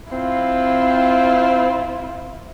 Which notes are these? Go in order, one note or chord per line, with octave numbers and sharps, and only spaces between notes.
C4 E4 F4